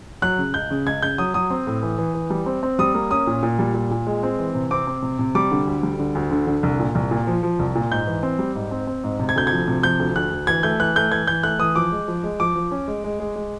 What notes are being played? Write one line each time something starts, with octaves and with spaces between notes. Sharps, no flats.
F#3 F#6
C#3
C#2 G6
C#3
C#2 G#6
C#3 G6
F#3 D#6
F#3 D#6
C4
A2
E3
E3
E3
G3
C4
C4
G3 D#6
A#3
C#4 D#6
A#2
A#2
G3
A#2
A#2
G#3
C4
E3
C3
C4 D6
C4
C3
C3
G3 D6
D3
D2
G3
D3
D2
D3
D3
C2
A#2
C2
A#2
F3
F3
C2
A#2
G#2 G6
E3
C4
G3
G#2
C4
C4
G#2
C3
G#6
D2 G6
F3 G#6
C3
F3 G6
D2
D2 F#6
D2
E3 G#6
A3 G6
E3 F#6
A3 G6
E3 G#6
E3 G6
A3 F#6
E3 D#6
F3 D6
G#3
F3
G#3
F3 D6
F3
C#4
G#3
G#3
G#3
G#3